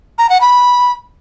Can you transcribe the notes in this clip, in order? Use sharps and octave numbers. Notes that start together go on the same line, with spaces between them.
A#5
F#5
B5